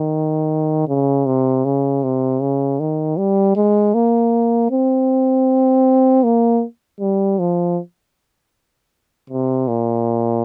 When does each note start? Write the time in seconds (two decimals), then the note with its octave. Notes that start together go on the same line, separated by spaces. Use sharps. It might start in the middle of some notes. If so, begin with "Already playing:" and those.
Already playing: D#3
0.88 C#3
1.26 C3
1.65 C#3
2.03 C3
2.41 C#3
2.80 D#3
3.18 G3
3.56 G#3
3.94 A#3
4.71 C4
6.24 A#3
7.00 G3
7.39 F3
9.30 C3
9.68 A#2